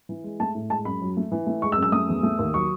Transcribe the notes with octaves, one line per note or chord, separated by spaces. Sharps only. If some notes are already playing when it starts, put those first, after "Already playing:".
E3
G#3
A3 A5
A2
G#3 A5
F#2 B5
F#3
A3
E3
A3
G#3 C#6
E6
F#2
E6
A3 D#6
E2
A3
D#2
F#3 C#6